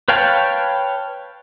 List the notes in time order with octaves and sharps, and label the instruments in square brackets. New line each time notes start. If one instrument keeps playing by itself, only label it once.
[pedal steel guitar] B4 C#5 F5 G5 A5